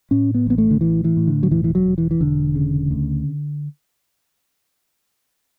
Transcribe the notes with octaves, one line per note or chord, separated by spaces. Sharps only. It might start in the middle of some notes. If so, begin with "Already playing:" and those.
A2 C#4
B3
A1 B3
A3
D3
A2 E3
E3
A2
D3
F#3
E1 E3
E3
F#3
E1
E3
E3
E1 D3
C#3
D2